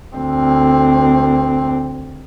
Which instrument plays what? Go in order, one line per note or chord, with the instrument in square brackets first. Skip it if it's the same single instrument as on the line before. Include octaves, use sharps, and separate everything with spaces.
[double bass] D2 C4